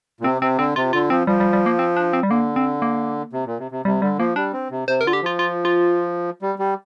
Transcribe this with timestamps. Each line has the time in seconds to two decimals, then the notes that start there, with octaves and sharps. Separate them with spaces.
0.20 A#2
0.24 C3 C4
0.42 C3 C4
0.58 D3 C4
0.76 C3 F4
0.93 D3 F4
1.10 F3 C4
1.27 F3 G3
1.40 G3
1.53 G3
1.66 A#3
1.79 C4
1.97 D4
2.13 C4
2.23 G3
2.30 D3 A#3
2.56 C4
2.82 A#3
3.33 C3
3.46 A#2
3.59 C3
3.71 C3
3.85 C3 G3
4.02 D3 G3
4.18 F3 A#3
4.36 G3 D4
4.53 C4
4.71 C3
4.88 C3 C5
5.01 A#4
5.05 D3 F4
5.13 G4
5.22 F3 F4
5.39 F4
5.65 F4
6.42 G3
6.59 G3